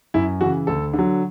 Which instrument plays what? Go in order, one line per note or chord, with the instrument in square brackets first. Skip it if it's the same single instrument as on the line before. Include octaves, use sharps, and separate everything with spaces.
[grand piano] F#2 E4
C#3 E3 F#4
D2 A4
D3 F#3